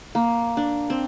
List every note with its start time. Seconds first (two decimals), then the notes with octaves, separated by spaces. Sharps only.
0.15 A#3
0.57 D4
0.90 C4